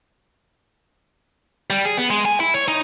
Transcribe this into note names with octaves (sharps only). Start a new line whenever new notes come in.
G3
G#4
B3
G#3
G#5
E4
C#5
D#4